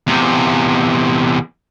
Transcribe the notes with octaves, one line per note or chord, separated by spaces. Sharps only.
E2 C3